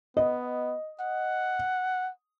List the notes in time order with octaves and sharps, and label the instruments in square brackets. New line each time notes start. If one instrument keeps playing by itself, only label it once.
[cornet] B3 [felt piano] D#5
[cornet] F#5